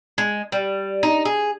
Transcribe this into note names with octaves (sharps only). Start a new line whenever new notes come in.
G#3
G3
D#4
G#4